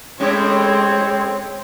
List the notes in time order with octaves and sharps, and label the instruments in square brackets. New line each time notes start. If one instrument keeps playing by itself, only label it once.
[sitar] A2 C#4 G4 [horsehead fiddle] G#3 C#5 [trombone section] C4